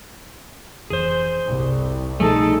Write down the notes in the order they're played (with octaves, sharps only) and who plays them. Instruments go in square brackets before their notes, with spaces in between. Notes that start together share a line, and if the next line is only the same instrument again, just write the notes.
[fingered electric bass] F1 F2 E3 [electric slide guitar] G#4 C5
[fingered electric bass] G1 [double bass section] C2
[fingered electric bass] B2 F3 G3 [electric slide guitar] A3 D#4 [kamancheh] G#4 A4